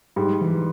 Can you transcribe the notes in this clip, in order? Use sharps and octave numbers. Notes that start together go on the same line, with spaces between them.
G#2 G3
E3